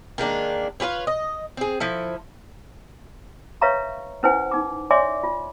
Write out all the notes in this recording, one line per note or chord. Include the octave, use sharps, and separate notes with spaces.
D#3 G#3 A#3 D4
F4 G#4 B4 C#5
D#5
C4 G#4
F3 E4 A4
B4 C#5 E5 F5 A#5 C#6
C#4 E4 B4 C5 F#5 G#5
D#4 D6
C#5 D5 E5 G#5 C6 D6
F4